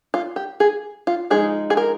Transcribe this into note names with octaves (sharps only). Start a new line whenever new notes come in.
F4
G4
G#4
F4
F3 G#3 D#4 G#4
G#4
A#4